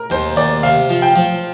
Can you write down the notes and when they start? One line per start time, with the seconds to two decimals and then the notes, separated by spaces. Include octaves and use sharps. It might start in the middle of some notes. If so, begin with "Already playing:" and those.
Already playing: A#4
0.10 D#2 C5
0.36 D#2 D5
0.63 C3 F5
0.90 F3
1.02 G5
1.16 F3